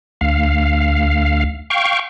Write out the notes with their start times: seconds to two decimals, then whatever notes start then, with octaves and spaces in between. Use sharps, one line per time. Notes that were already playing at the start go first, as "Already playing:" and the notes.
0.21 D2 F5
1.70 F5 G5 C#6